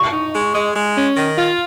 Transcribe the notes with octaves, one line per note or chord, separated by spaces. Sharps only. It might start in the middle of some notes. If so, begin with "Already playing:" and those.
Already playing: C#6
D#4
G#3
G#3
G#3
C#4
D#3
F4